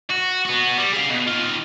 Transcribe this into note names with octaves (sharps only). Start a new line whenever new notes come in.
F#4
B3 F#4
G3
G#4 F5
B2
D#3 F4